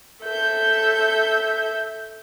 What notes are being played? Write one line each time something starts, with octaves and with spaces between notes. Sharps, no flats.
A4 E5 G6